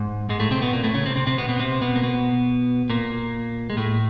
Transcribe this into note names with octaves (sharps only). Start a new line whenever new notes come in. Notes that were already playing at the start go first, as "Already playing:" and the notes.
Already playing: G#2
G#2 G#3
A2 A3
C3 C4
B2 B3
A#2 A#3
A2 A3
C#3 C#4
C3 C4
C3 C4
C3 C4
B2 B3
B2 B3
C3 C4
B2 B3
A#3
B2 B3
A#2 A#3
G#3
A2 A3